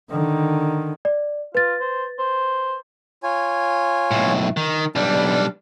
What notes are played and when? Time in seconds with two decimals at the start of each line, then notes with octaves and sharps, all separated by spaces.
0.11 D3 D#3
1.05 D5
1.55 F4 B4 A6
1.80 C5
2.19 C5
3.23 F4 C#5 G#5
4.11 B1 A2
4.57 D#3
4.95 B1 G3 D4